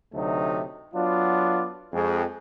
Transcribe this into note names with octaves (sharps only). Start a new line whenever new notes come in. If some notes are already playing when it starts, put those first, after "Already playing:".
D2 C3 F#3 A3 D#4
F#3 B3 D4 F4
F2 G#3